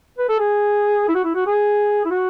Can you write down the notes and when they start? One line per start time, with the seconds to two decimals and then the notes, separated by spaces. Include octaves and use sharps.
0.19 B4
0.29 A4
0.39 G#4
1.09 E4
1.15 F#4
1.24 E4
1.35 F#4
1.47 G#4
2.06 E4
2.11 F#4